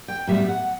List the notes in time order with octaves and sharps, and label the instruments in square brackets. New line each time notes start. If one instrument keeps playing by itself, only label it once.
[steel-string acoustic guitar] G5
A2 G3 B3 E5
F#5